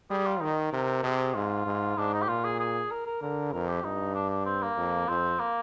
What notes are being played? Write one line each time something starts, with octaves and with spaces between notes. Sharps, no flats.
G3 G#4
F4
D#3 D#4
C3 A#4
C3 G#4
G#2 F4
G#2
G#2 D4
D#4
G4
A#2 F4
G#4
G#4
A#4
A#4
D3 A#4
F2 A#4
G4
G2 D#4
D4
D4
C4
A#3
F2
F2 C4
A#3